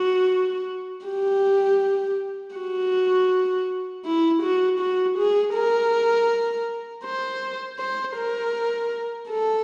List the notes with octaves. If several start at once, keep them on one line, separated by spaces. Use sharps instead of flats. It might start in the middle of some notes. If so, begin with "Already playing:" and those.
Already playing: F#4
G4
F#4
E4
F#4
F#4
G#4
A#4
C5
C5
A#4
A4